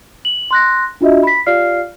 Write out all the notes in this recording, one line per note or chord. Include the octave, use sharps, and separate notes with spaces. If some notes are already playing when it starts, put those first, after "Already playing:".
F#7
C6 F#6 A#6
D4 F4 F#4 D#5 E5
B5 B6
F4 G4 D5 F5 F6 C7